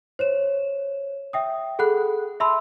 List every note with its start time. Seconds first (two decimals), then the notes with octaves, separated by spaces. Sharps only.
0.19 C5 C#5 E7
1.33 E5 G5 D#6
1.79 G#4 A4 F#5 B5 F#6
2.40 E5 A5 B5 C6 E6